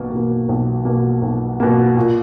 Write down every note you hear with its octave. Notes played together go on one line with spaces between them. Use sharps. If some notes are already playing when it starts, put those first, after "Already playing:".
Already playing: B1 B2 A#3
B2 A#3
B1
B2 A#3
B1
B2 A#3
A#2